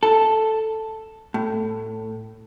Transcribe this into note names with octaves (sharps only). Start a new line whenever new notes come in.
A4
A2